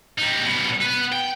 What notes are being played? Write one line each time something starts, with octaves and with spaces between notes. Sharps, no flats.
G3 D#4
B2 G3
B4 F#5
G5